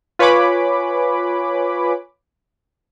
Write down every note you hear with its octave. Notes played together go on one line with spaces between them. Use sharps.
F4 B4 C#5 G#5 B5 D6